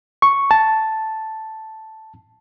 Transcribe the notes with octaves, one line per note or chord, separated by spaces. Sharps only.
C#6
A5